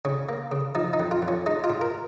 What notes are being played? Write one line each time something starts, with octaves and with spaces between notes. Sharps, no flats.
C#3 C#4
A#3
C#3
F3 D#4
D#4
F2
F4
F2
C#4
G#3 D#4
F4
G#2
A#4